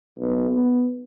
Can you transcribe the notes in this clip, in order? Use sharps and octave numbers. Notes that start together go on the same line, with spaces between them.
B1
B3